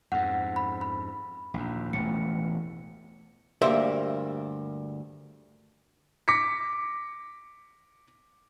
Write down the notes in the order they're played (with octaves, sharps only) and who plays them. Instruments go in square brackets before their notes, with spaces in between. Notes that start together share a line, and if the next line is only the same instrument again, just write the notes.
[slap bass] F2 G#2 [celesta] F#5
[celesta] B5
B5
[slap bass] A#1 D#2
[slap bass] E1 A1 A3 [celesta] C#7
[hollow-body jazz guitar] D2 G2 A#3 C5 E5
[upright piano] D6 A#6 B6 C#7